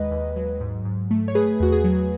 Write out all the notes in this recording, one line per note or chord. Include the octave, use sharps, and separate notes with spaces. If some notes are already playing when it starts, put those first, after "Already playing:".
Already playing: D#2 G#3 B4 D#5
D#2
F#3
G#2
G#2
A3
C#5
A3 G#4 B4
E2 F#4
G#4
F#3